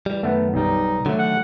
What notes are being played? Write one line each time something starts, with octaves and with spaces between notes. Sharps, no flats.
E3 G3
F#2 D#3 A3 B3
B1 G3 D#4
D3 D#3 F#3 A3
F#5